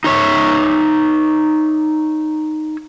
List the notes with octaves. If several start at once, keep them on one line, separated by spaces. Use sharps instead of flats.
D#4 C#5 E5